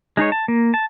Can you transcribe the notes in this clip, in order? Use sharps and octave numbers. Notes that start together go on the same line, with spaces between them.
G#3 D#4 G#4 C#5
A5
A#3
A5